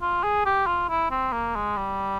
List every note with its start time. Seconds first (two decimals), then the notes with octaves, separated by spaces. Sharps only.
0.01 F4
0.24 G#4
0.45 G4
0.67 F4
0.89 E4
1.11 C4
1.33 A#3
1.55 G#3
1.77 G3